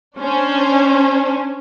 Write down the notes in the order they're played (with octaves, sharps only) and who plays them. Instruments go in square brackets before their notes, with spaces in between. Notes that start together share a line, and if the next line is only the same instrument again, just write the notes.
[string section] C#4 D4 C5